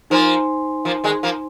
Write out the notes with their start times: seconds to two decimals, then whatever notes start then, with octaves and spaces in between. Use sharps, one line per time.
0.10 F3 A#3 D#4 C5 G#5 C6
0.85 F3 A#3
1.04 D#3 G#3
1.23 F3 A#3